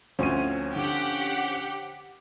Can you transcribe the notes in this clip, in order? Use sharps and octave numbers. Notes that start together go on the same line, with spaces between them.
D2 F3 C4 C#4 C#5 D#7
D3 G4 F#5